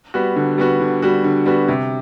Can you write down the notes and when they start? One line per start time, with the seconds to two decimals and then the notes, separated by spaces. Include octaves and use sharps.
0.14 G3 B3 F#4
0.36 D3
0.58 G3 B3 F#4
0.80 D3
1.02 G3 B3 F#4
1.24 D3
1.46 G3 B3 F#4
1.68 C3